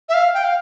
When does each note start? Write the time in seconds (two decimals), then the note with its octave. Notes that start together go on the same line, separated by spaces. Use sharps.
0.09 E5
0.14 F5
0.34 G5
0.44 F5